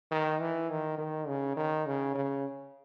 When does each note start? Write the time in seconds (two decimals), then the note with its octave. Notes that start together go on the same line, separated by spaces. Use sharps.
0.11 D#3
0.41 E3
0.70 D#3
0.98 D#3
1.28 C#3
1.56 D#3
1.86 C#3
2.15 C#3